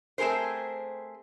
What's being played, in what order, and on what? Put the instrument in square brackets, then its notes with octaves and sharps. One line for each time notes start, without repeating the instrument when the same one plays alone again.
[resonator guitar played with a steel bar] A3 C4 G#4 A#4 C5